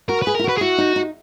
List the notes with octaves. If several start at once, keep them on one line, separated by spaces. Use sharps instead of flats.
F#4 A#4
G#4 B4
A#4
E4
F#4 B4
G#4
E4 F#4
D#4
D#4